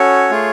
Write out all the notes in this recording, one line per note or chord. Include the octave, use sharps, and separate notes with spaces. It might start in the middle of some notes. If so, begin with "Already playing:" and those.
Already playing: C#4 F#4 A4 C#5
A3 F4 G#4